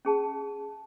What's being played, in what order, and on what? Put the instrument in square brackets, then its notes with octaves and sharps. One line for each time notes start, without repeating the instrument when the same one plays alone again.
[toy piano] C#4 G#4 A5